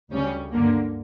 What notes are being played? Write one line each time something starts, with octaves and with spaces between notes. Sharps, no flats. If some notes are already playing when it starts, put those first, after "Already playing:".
D2 C#3 G3 C#4
G2 D3 A#3